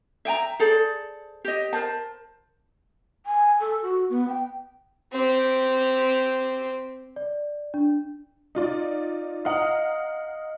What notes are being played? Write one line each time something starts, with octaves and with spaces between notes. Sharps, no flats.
E5 G5 G#5 A#5
G#4 A4 C5 D5
G4 D#5
A#4 C5 A5
G#5
A4
F#4
B3
G5
C4 G4
D5
D4
D#4 F4 D5
D#5 F5 F#5 A#5